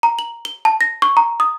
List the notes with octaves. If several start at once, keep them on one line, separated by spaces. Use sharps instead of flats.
A#5
F#7
G7
A5
A#6
C#6
A#5
D#6